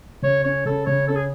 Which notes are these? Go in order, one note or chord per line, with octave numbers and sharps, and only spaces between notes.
C#3 C#5
C#4 C#5
C#3 A4
C#3 C#5
C#4 A4
G#4